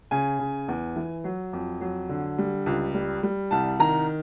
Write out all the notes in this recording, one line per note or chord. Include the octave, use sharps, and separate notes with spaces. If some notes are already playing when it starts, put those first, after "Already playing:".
C#3 G#5
C#3
E2
E3
F#3
F2
F#3
D3
G3
C#2
G3
G3
C2 A5
D#3 A#5